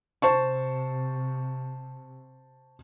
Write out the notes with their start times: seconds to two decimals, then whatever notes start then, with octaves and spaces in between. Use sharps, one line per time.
0.22 C3 C5 A5 C#6